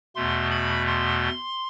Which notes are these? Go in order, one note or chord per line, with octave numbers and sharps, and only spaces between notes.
E2 B2 A3 C6
B5
C6